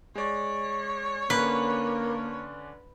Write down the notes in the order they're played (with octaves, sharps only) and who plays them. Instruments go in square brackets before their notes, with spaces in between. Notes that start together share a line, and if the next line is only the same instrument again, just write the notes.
[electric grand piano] G#3 D5 [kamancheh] C#5
[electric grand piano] D3 C#4 D4 [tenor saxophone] A#3 [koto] B4